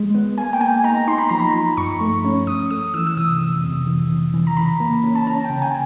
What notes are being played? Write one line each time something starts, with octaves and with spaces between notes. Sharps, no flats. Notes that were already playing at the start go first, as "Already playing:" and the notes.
Already playing: G#3
B3
A#3 G#5
G5
A#3 G#5
D#4 A#5
D#4 C6
B5
F3 A#5
B5
F3
G2 C#6
A3
C#4
G2 D#6
A3 D#6
E3 E6
E6
C3 D#6
F2
C3
E3
C3
E3
A#5
C#3 B5
A#3
C#4
A5
C#4 A#5
G5
C#3
G#5